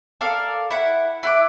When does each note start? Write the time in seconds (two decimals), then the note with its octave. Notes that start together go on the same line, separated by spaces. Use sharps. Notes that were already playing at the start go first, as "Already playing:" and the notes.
0.21 A4 A#4 D5 F5
0.71 E4 F#5
1.23 E4 F#5 D6